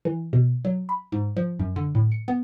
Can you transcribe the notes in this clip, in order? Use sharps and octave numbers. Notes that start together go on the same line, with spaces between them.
E3
B2
F#3
B5
G#2
F3
F#2
D3
A2
C#7
B3